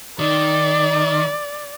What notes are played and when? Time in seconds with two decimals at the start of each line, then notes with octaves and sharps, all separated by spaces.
0.19 D#3 D5